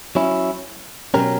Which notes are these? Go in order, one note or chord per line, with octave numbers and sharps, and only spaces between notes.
F#3 C#4 E4
B2 F#3 C#4 G4 A#4